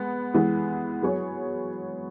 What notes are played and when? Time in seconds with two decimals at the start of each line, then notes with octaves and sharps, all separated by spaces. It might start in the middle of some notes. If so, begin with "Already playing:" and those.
Already playing: G#3 B3
0.34 E3 G#3 B3
1.02 F#3 B3 G#4 C#5